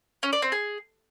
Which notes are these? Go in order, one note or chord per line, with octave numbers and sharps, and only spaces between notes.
C#4
D5
C4
G#4